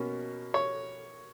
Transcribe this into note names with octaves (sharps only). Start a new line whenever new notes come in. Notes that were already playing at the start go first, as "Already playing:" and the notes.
Already playing: B2 A#3 C#4
C#5